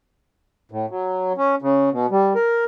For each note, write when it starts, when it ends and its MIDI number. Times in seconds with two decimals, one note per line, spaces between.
0.71 0.86 45
0.90 1.33 54
1.38 1.55 61
1.62 1.90 49
1.92 2.06 47
2.11 2.33 55
2.35 2.64 70